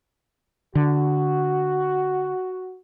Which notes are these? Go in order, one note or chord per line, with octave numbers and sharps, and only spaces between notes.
D3 F#4